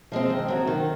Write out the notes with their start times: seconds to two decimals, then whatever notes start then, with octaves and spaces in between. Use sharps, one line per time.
0.12 F3 G#3 C4
0.30 D#3
0.48 F#3 C4
0.67 D#3